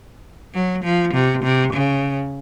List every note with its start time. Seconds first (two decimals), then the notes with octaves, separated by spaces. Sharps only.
0.54 F#3
0.84 F3
1.14 C3
1.43 C3
1.73 C#3